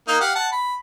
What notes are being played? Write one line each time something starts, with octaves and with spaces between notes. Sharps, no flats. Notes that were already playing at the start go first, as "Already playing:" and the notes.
A#3 D#4
G4 F5 F#5
F#5 A5
B5